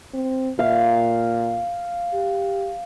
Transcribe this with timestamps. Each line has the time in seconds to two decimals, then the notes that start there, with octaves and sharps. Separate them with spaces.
0.13 C4
0.59 A#2 F5
2.14 G4